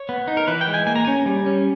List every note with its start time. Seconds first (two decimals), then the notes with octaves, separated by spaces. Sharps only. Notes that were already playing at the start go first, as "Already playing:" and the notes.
Already playing: C#5
0.09 B3
0.28 D#4
0.37 A#4
0.47 E3 B4
0.61 G5
0.67 G#3
0.74 G#5
0.86 A#3 G#5
0.96 A#5
1.05 C#4 G#5
1.26 G3
1.46 C#4